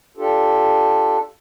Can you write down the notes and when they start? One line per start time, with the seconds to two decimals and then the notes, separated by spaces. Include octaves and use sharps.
0.17 D4 F4 G4 A4